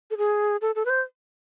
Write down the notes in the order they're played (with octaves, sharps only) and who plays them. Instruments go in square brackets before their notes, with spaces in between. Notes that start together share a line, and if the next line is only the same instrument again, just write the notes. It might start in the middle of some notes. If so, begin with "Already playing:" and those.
[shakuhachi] A4
G#4
A4
A4
B4
C5